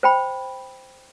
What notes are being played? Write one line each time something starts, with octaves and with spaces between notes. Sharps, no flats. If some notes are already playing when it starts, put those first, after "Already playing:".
C5 G5 B5